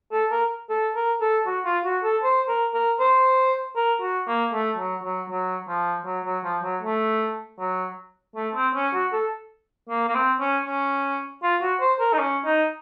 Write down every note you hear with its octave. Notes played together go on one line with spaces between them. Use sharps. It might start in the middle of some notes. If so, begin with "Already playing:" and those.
A4
A#4
A4
A#4
A4
F#4
F4
F#4
A4
C5
A#4
A#4
C5
A#4
F#4
A#3
A3
F#3
F#3
F#3
F3
F#3
F#3
F3
F#3
A3
F#3
A3
C4
C#4
F#4
A4
A#3
A#3
C4
C#4
C#4
F4
F#4
C5
A#4
D#4
C#4
D#4